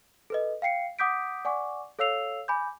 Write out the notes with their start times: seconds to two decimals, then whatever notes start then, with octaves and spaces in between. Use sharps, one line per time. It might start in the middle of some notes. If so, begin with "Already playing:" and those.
0.30 A4 B4 D#5
0.62 F5 G5 C7 C#7
0.99 F#5 D6 D#6 G6 B6 D7
1.45 D5 F#5 G#5 C#6 D6
1.99 A4 C#5 F5 E6 C7 F7
2.48 G#5 B5 D6 G6